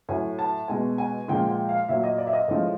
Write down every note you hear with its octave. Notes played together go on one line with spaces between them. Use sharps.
A2 F#3 G#5
A5
B2 G#3 G#5
G#5
A#2 F3 G#3 G5
G5
F5
A#2 F#3 E5
D#5
D5
E5
D#5
A2 F3 G#3 D#5